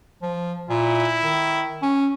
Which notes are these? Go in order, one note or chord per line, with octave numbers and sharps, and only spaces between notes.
F3
A#2 E4
D#3
C#4